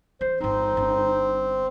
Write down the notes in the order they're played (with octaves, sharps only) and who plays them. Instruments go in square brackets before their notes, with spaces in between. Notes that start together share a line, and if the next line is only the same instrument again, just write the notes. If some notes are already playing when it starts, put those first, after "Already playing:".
[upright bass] E3 [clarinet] C5
[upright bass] D1 G1 [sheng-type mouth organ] C4 [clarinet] D#4
[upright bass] G1 C#4